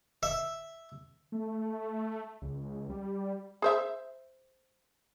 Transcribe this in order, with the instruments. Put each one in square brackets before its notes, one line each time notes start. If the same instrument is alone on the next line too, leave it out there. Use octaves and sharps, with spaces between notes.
[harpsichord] E5
[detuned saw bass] A3
C#2
G3
[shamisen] G#4 C5 E5